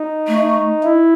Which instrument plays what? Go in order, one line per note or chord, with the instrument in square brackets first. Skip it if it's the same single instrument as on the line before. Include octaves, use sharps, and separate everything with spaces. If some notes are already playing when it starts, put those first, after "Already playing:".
Already playing: [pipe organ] D#4
[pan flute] A3
[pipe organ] D#4
E4